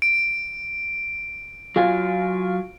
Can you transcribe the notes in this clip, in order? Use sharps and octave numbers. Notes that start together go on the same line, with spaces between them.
D7
F#3 F4 G#5